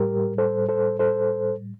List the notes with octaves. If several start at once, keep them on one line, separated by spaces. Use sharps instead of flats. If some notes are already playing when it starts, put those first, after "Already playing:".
Already playing: A2 G3 G4 A#4
A4 C5
A4 C5
A4 C5